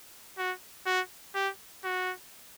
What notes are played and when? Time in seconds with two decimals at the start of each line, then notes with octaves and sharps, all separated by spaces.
0.38 F#4
0.86 F#4
1.35 G4
1.84 F#4